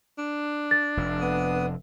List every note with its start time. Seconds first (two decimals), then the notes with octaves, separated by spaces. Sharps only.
0.18 D4
0.71 A6
0.97 F1 F2
1.21 B3 D#6